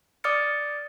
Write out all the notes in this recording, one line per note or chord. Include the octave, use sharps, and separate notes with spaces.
D5 D6 D#6 F6 A6 C#7